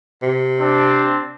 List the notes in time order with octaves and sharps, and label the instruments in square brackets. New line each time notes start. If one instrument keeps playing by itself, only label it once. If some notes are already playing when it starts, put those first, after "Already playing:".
[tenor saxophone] C3
[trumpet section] C4 D4